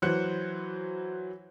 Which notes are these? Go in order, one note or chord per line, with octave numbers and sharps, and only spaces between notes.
E3 F#3 C5 F#6 C#7